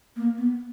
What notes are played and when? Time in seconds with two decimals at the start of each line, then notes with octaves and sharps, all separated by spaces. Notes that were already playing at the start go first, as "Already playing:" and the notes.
0.16 A#3
0.38 B3